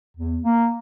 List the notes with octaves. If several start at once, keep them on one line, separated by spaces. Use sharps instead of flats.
E2
A#3